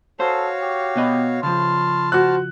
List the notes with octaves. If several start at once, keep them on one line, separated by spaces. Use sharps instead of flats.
F#4 A4 C5 C#5 F5
G4
B2 B3 D#5
C#3 F3 A5 C6 F6
F#4 C5 F#6